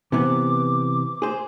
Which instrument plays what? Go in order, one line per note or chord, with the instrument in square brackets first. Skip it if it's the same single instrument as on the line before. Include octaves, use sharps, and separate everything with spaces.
[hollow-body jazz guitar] C3 E3 B3 [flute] D6
[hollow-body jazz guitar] G#4 C5